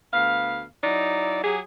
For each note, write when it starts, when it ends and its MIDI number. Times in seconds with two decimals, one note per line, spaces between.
0.14 0.64 38
0.14 0.64 59
0.14 0.64 77
0.84 1.41 54
0.84 1.41 63
0.84 1.41 64
0.84 1.41 74
1.44 1.60 54
1.44 1.60 67
1.44 1.60 68